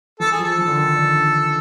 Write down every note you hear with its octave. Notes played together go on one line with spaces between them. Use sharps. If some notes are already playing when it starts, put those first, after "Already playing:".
E3 A4
G#4
F3
A4
E3
D3
D#3
D3
D3